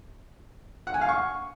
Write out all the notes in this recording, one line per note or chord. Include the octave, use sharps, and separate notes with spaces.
F#5
G#5
F5
C#6